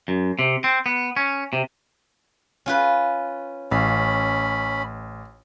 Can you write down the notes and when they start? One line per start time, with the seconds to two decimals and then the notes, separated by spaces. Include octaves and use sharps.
0.08 F#2
0.39 C3
0.64 C4
0.86 B3
1.17 C#4
1.53 C3
2.66 C#4 F4 B4
3.71 A1 C#4 F5 B5